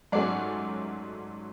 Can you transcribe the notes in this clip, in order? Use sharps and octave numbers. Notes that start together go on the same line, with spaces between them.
G#2 F#3 A3 C#4 D5 F#5